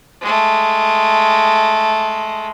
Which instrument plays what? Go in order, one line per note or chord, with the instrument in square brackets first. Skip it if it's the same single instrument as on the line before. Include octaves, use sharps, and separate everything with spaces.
[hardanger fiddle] G#3 A3